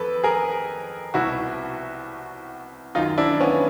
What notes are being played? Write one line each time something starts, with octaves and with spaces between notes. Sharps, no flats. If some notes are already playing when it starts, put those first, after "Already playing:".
Already playing: F2 A4 B4
G#4 A#4
C2 B2 E4 F#4
F#2 D#3 D#4 F4
D4 E4
B3 C#4